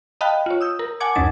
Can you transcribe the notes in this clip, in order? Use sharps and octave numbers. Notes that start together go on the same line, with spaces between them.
D#5 F5 G5 A5 B5 F#6
F4 C#5
D#6 E6 G6
A#4
F#5 G#5 A5 D6 G#6 C#7
C#2 F#2 C#4 D#4 A6